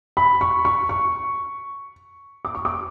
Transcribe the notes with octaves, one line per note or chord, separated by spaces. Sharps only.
B5
C#6
C#6
C#6
D6
C#6
D6